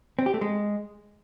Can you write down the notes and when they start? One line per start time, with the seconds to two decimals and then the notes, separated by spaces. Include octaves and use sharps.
0.19 C4
0.26 G4
0.34 A3
0.41 G#3